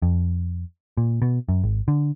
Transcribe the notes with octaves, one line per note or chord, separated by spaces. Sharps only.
F2
A#2
B2
F#2
G#1
D3